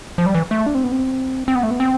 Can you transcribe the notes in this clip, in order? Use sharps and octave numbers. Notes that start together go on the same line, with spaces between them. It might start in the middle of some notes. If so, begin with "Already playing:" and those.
F3
G3
E3
A3
D4
C4
B3
C4
C4
B3
A3
B3
C4